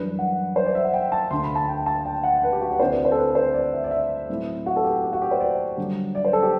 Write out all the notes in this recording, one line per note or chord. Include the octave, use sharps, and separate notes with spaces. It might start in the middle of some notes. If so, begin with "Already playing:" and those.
Already playing: F#2 E3 G3 D4 B4
F#5
C5
D5
E5
F#5
G5
A5
D2 D3 A3 C6
B5
A5
G5
A5
G5
F#5
B4
G4
F#4
G4
D2 D3 A3 C4 E4 C5
D5
C5
A4
B4
C5
D5
E5
D5
E5
A2 F#3 C4 E4
F#4
A4
G4
G4
F#4
G4
C5
D5
G2 D3 F#3
D5
C5
A4
G4